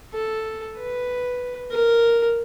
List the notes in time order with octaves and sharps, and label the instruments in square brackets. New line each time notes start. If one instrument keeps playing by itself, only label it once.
[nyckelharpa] A4
B4
A#4